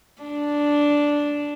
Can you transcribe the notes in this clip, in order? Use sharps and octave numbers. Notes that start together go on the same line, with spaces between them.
D4